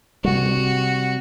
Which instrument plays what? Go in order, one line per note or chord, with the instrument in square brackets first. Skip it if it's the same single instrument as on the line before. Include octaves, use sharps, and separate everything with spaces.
[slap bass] C3 G3 [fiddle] F#4